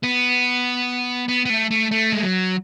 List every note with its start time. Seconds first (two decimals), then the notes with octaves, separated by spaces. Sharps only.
0.03 B3
1.28 B3
1.46 B3
1.50 A3
1.71 A3
1.91 A3
2.12 G#3
2.23 F#3